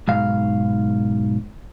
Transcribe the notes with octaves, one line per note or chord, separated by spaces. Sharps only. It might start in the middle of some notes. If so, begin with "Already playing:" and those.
B1 G#2 F5